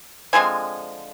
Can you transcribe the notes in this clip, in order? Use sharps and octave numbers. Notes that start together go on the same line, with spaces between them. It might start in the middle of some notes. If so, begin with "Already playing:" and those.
D3 F3 G#3 C4 G#5